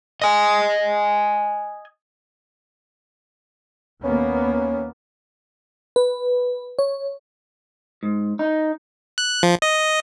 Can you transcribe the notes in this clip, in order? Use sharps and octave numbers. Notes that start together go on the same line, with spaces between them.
D#5 G#5
D#2 A#3 B3 C#4
B4
C#5
G#2
D#4
F#6
F3
D#5